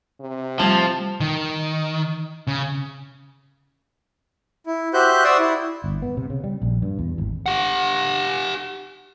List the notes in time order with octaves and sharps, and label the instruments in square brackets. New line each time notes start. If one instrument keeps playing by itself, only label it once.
[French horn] C3
[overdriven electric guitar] F3 [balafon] G3 A3 C5 [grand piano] A5
[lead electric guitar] D#3
C#3
[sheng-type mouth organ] E4
F#4 G4 C5 E5 F#6 G6
D5 F#5 C6 C#6 D#6 E6
E4
[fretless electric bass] G1
B3
C3
C#3
G3
A#1
G2
E2
G#1
[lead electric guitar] G4 F#5